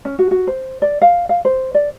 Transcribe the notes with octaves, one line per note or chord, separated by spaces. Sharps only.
C#4
F#4
F#4
C5
D5
F5
F5
C5
D5